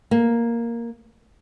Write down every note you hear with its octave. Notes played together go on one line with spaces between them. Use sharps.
A#3